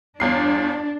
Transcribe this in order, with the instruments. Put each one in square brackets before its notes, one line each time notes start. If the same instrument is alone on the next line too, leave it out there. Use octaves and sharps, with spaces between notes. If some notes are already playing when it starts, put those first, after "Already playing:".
[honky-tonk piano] G1 E2 C7 [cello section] D4